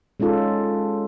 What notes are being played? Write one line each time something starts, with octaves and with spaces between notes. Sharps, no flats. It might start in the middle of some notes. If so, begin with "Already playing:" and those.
G#3 C#4 D#4 F4 A4